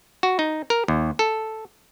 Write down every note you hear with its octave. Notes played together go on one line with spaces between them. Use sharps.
F#4
D#4
A#4
D#2
A4